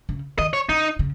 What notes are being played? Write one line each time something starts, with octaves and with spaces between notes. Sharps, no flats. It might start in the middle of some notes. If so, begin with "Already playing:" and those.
C#3
D#3 D#5
C#5
C#3 D#4
C#3